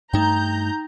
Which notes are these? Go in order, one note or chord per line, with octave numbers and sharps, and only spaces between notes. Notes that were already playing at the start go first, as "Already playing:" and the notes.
G2 A3 D#4 G5 A#5 G6